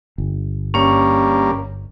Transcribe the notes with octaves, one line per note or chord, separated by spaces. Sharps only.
G1
G2 A#3 C#4 C#5